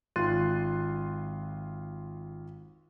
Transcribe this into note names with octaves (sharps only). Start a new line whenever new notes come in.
G#1 F4 C6 F#6 A6 D#7